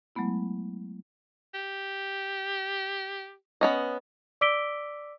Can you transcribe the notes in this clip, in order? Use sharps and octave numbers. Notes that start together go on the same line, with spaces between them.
F#3 G#3 A3 B3 E4
G4
B3 C#4 D#5
D5 D6 E6 B6 D7 G7